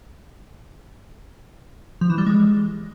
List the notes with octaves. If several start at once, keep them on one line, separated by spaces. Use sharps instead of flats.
F3
E3
G3
G#3